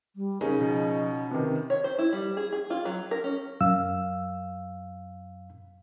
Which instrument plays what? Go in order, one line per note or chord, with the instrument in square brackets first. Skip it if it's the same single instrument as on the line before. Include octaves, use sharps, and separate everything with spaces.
[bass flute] G3
[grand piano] C#3 C#4 D#4 [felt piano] G#4 [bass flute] A#4
[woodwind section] B2 [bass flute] F3
[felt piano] C3 D#3 [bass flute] B4
[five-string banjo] C#5
C5
E4
G3
G#4
G#4
F4
F#3
A#4
C#4
[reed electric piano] F#2 F5 E6